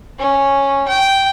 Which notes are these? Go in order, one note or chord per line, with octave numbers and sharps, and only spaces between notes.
C#4
G5